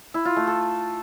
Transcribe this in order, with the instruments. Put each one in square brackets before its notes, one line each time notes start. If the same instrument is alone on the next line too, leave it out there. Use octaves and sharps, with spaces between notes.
[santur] E4
F4
A3
A4